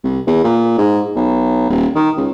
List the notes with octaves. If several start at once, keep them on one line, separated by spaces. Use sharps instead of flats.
C2
E2
A#2
G#2
B1
D#1
D#3
C#2